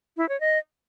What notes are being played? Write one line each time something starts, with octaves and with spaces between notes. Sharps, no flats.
E4
C#5
D#5